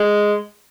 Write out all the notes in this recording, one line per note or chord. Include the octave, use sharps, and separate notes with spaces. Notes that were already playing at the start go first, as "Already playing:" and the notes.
Already playing: G#3